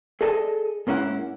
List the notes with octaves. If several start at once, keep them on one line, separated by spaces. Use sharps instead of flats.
G#4 A4 D5 D#5 G#5 A5
G#2 A#3 C#4 E4 F#5